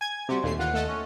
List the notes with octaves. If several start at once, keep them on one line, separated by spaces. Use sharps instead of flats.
G#5 G#6
C3 G3 F#4 G4 C5
D#2 A#2 A3 C7
E3 A#3 F4 F#5
A3 A4 D#5
C#4